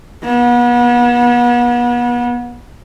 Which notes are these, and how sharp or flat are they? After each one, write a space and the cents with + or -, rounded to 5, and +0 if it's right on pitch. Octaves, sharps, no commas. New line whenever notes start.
B3 -35